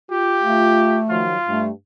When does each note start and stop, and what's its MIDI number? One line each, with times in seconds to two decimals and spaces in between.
0.12 0.99 65
0.12 1.00 67
0.43 1.23 57
1.10 1.35 51
1.10 1.35 53
1.10 1.35 54
1.10 1.62 65
1.48 1.72 43
1.48 1.70 57